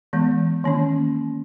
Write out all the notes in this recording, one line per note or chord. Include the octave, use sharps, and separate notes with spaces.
E3 G#3 B3
D#3 A#3 C#4